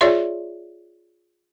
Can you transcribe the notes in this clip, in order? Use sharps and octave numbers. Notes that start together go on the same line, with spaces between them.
F4 G#4 C#5 D5 E5 C6